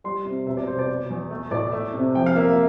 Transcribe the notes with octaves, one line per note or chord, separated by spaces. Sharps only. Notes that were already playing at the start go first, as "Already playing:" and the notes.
G3 C6
C3
E1 E5
D5
E1 C5
D5
E1
E2
A3
A2 D5
A3 E5
C3
F3 G5
F5
A#3 E5
E5